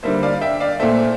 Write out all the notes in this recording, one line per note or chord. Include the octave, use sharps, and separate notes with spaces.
D3 G3 A#3 C5 E5
D5 F5
E5 G5
D5 F5
A#2 A3 C5 E5